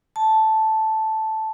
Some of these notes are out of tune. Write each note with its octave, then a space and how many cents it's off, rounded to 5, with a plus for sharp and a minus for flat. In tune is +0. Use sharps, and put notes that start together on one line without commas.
A5 -5